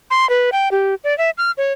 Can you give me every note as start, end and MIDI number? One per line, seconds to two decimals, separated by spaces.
0.11 0.28 84
0.30 0.50 71
0.52 0.69 79
0.72 0.95 67
1.04 1.16 74
1.18 1.30 76
1.38 1.51 89
1.58 1.73 73